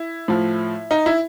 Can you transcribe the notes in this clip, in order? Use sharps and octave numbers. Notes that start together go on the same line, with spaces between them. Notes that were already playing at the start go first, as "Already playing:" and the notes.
Already playing: E4
A2 F3
D#4
E4